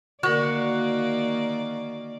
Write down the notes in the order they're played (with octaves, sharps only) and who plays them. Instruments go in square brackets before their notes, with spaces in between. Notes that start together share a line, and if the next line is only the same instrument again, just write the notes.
[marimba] D3 A#4 [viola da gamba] D#3 A#3 D5 [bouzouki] F#4